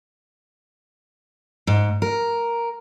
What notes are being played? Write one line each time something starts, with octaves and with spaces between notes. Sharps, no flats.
G#2
A#4